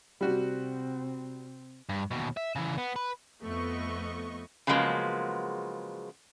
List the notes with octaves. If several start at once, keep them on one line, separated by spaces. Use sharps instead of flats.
C3 G3 C4 F#4
G2
D#2 B2
E5
C#3 E3
B3
B4
F2 A3 B3 D#5 C#6
C#3 F3 F#3 G#3 A#3 B3